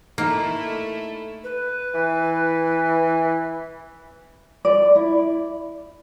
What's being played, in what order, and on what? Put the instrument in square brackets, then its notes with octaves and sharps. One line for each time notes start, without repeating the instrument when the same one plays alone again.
[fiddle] A3 E4 [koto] A#3 [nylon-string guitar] D#4
[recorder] B4
[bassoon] E3
[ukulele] D5
E4